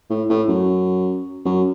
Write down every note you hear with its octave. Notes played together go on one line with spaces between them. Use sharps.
A2
A2
F#2
F#2